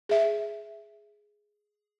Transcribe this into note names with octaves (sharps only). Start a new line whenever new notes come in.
G#4 E5